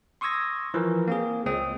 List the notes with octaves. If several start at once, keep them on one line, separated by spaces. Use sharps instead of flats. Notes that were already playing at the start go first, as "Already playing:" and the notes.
C6 C#6 D#6 E6 G#6 A#6
E3 F3 A#4
A#3 C4 G#4
C#2 G#3 C4 D#6